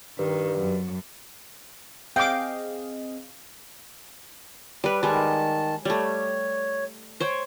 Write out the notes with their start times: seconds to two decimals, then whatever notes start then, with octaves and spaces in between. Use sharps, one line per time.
0.19 G2 D#3
0.59 F#2
2.16 C4 G#4 D#5 F5 G5 D6
4.84 G3 B4
5.03 D#3 G3 G#3 A5
5.85 G3 A3 C#5
7.20 C5 C#5 G5